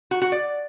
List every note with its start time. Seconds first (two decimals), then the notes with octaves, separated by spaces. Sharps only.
0.11 F#4
0.22 F#4
0.32 D5